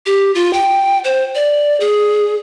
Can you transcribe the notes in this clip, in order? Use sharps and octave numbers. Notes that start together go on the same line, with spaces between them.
G4
F4
G5
C5
D5
G#4